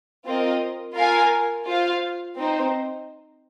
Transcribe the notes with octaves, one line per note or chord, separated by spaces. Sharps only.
C4 F4 A#4 D#5
F4 A#4 F5 G#5
F4 C5 F5
C4 D#4 C5